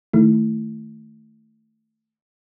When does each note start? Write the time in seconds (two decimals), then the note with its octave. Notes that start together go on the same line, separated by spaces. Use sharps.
0.13 D#3 A3 E4